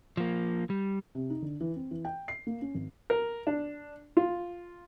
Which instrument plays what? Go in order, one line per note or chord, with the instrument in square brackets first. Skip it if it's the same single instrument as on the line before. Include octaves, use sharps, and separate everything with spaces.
[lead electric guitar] F3 A#3
G3
[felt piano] C3
D#4
D3
E3
C4
E3
G5
C7
A#3
C#4
G#1
[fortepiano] A#4
D4
F4